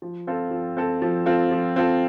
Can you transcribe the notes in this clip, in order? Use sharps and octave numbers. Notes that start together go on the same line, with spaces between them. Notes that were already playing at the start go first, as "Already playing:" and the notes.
F3
C4 F4 A4
F3
C4 F4 A4
F3
C4 F4 A4
F3
C4 F4 A4